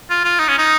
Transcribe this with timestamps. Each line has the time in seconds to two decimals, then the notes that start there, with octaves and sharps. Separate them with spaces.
0.10 F4
0.24 F4
0.40 D#4
0.48 C#4
0.58 D#4